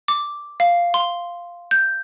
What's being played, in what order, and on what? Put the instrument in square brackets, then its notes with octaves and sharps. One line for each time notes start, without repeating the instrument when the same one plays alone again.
[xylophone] D6
F5
C6
G6